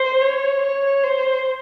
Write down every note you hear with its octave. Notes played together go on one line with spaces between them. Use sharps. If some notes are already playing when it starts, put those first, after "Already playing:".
Already playing: C5
C#5
C#5
C5